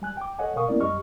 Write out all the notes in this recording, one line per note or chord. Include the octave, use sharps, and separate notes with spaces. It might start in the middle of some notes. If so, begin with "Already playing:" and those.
G3 G#5 F#6
G5 D6
A4 C#5 D#5 F#5 G#5
B2 A#4 F5 C#6 D#6
A#3 B3 C#4 E4 A#4 D5
F#2 G3 G4 D#5 C#6 F6